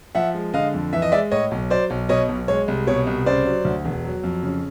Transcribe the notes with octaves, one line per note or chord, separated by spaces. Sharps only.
F3 E5 F#5
G#3
D3 D#5 F5
F2
E3 E5
D#5
G#3 D5 E5
A2 C#5 D#5
B1
F#3 C5 D5
B1
B2 C#5 D#5
B1
G#3 C#5
C2
B2 C#5
C2
C#3 C5 D5
F#3
D2
E1
F#3
F2
C#3